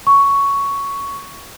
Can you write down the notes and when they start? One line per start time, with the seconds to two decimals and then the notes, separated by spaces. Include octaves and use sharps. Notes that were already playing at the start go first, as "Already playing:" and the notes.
0.07 C#6